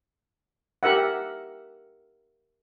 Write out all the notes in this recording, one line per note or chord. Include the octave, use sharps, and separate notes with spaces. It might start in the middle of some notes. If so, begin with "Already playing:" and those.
G4 A#4 E5 F#5